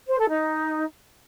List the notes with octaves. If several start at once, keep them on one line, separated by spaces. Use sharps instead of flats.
C5
A4
D#4